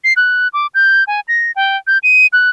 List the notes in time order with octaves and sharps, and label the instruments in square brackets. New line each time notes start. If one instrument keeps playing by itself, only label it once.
[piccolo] C7
F#6
D6
G6
G#5
A#6
G5
G6
D#7
F#6